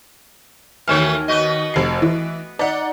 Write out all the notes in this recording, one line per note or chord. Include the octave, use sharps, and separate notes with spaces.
D#2 E3 A3 F#4 C#5 F6
B3 F#4 D#5
F1 C7
E3
D#4 D5 F#5